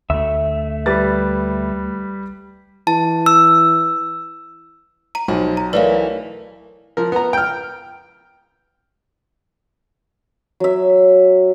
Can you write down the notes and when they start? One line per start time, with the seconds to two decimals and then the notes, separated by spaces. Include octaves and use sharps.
0.10 D2 A3 E5
0.86 G3 B4 A6
2.87 E3 A5
3.26 E6
5.15 A#5 D#7
5.28 B1 F3
5.57 A#5
5.73 E3 A3 A#4 B4 C#5 D5 F5
6.97 F3 A#4
7.12 B3 A#5
7.33 G5 F6
10.60 F#3 E5